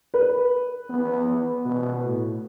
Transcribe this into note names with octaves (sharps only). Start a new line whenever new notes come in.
B4
B3
B2
A2